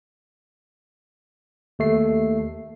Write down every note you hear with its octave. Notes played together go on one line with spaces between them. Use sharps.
D#2 A3 C7